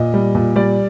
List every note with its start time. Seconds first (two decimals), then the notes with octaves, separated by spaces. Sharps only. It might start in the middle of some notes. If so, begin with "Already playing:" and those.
Already playing: A#2 D#5
0.14 G3
0.35 A#2
0.56 G3 D5